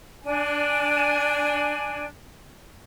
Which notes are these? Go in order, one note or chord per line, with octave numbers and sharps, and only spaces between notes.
D4 G#5